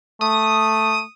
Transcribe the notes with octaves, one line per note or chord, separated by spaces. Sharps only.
A3 D#6